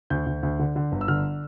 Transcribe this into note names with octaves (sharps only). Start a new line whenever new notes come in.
D2 G6
D2
D2
D3
D3
G1
E6
D3 F6